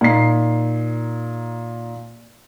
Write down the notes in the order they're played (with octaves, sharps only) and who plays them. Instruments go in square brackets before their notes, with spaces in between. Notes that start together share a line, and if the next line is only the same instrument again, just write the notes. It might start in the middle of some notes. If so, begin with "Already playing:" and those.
[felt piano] A#2 D#4 C7